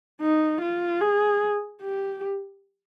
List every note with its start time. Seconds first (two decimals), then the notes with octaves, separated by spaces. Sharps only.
0.21 D#4
0.62 F4
1.01 G#4
1.82 G4